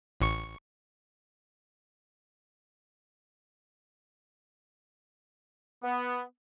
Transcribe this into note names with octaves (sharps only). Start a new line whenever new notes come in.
A1 C#6
B3